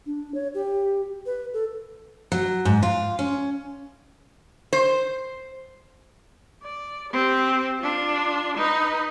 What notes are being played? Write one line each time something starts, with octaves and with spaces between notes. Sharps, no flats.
D4
C#5
G4
B4
A4
F#3
G#2
F4
C#4
C5
D5
C4 G4
D4 F4
D#4 B4